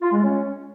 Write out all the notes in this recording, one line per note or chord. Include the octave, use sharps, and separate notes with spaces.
F4
G#3
C#4